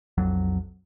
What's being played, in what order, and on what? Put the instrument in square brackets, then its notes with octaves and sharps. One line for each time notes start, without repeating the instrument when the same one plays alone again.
[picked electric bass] B1 F2 F#3